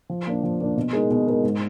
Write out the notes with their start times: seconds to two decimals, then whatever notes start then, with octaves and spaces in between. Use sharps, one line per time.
0.09 F3
0.27 A#3 D4
0.43 F3
0.61 A#3 D4
0.77 B2
0.93 G#3 D#4 A#4
1.10 B2
1.28 G#3 D#4 A#4
1.43 G#2